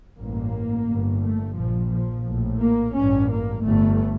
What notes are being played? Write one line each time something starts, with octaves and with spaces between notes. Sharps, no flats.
A1 G2 A#3
G1 G2
A3
A#1 A#2 F3
F3
A#1 A2
A#3
A1 G2 C#4
A#3
G1 G2 A3